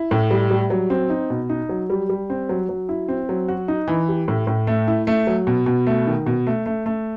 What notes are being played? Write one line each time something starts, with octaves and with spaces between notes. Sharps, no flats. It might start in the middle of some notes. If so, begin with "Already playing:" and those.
Already playing: E4
A2
G3
G3
F#3
C4
D#4
B2
D#4
F#3
G3
G3
C4
F#3
F#3
E4
C4
F#3
F#4
D#4
E3
G4
A2
A2
A3
E4
A3
F#3
B2
B2
A3
D#3
B2
A3
A3
A3